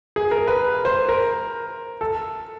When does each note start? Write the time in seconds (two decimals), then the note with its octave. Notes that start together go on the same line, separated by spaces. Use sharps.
0.16 G#4
0.31 A#4
0.47 B4
0.85 C5
1.09 A#4
2.01 A4